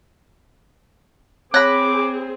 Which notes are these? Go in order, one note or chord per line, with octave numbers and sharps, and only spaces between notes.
C4 G#4 C#5 B5 D6 F#6 A#6